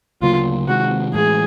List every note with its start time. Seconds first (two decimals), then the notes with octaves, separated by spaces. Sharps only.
0.22 D2 C#3 F#3 A#3 F4
0.68 C3 D#3 G#3 F#4
1.13 A2 E3 G#3 G#4